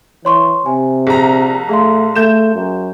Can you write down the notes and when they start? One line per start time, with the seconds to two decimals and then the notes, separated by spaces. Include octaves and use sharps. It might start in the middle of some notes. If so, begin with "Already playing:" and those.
0.25 E3 C#5 C6 C#6
0.66 C3 G#5
1.07 A#1 G#4 A#5
1.69 A3 G#4 F5 C6
2.16 A3 G6 E7
2.54 F#2